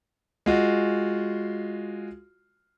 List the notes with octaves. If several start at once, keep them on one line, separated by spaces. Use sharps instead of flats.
G#3 F4 F#4